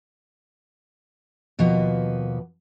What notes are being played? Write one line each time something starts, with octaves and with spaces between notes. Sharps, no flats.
D#2 B2 F3 A#3 B3